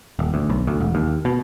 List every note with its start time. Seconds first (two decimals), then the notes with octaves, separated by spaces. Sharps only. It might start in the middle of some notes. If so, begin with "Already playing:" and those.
0.19 D#1
0.34 D2
0.50 B1
0.67 D2
0.80 E1
0.95 D#2
1.25 B2